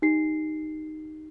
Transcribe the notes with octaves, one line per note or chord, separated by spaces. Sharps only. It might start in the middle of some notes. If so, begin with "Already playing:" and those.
D#4 G4 C7